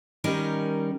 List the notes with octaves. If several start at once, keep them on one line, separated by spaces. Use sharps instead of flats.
D#3 G3 C#4 D#4 A#4